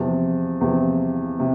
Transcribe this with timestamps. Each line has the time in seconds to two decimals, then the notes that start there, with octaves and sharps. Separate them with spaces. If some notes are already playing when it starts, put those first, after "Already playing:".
Already playing: E2 C3 F3
0.61 E2 C3 F3
1.40 C3